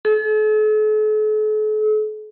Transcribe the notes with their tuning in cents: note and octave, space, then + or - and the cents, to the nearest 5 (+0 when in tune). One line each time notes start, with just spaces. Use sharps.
A4 -45